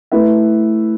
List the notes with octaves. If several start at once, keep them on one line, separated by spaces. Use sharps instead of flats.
A3 E4 B4 E5